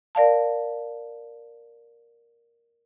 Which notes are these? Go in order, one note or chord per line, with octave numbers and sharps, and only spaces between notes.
A#4 D5 F5 A5